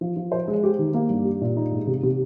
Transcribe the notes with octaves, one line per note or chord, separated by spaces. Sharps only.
F3
F3
C5
G#3
G4
D#3
A#3
G2
G4
A#2
D#4
G#2
C3
C3